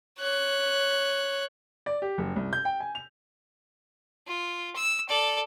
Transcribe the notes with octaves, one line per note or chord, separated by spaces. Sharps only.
C#5 F#6
D5
G4
F#1
C2
G6
G5
G#5
F7
F4
E6
A4 D5